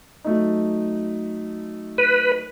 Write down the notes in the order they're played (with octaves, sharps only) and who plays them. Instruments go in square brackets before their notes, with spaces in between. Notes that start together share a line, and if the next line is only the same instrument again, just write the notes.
[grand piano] F#3 A3 D#4
[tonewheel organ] B4